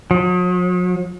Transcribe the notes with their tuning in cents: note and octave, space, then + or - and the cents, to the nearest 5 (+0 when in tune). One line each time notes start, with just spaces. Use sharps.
F#3 -45